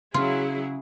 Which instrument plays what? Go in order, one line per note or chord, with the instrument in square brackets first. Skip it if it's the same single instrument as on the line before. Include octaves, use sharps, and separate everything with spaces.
[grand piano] C#3 [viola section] F#3 E4 G#4 [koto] F4